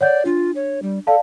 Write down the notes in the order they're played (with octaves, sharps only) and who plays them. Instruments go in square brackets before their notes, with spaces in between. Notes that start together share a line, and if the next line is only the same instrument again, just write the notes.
[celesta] C#5 F#5 G6 [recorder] D5
[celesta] D4 [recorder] F4
[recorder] C#5
G3
[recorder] A4 [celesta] D5 F5 A5